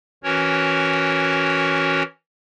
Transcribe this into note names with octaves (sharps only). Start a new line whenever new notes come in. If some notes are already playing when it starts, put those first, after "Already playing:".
E3 C#4 F#4 A#4 C#5